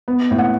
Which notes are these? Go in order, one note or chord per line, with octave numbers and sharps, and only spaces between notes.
B3
A2
F#5